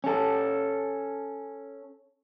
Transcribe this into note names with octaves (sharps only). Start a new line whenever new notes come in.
C#4 A4